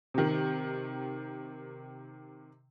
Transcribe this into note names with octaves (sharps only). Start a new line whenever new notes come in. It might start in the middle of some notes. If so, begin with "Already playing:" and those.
C3 D#3